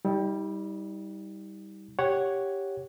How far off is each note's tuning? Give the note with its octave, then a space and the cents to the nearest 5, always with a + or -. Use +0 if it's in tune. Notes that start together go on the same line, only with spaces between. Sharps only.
G3 +0 D#4 +40
G4 +0 C#5 +0 F#5 +0